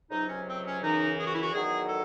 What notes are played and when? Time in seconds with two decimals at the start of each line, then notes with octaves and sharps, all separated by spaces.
0.10 C#2 C3 F#3 D#4
0.28 C#4
0.47 C4
0.64 C#4
0.82 F#2 C#3 E3 D#4
1.18 G#4
1.26 F#4
1.33 E4
1.41 F#4
1.53 E2 D#3 F#3 G#4
1.88 A4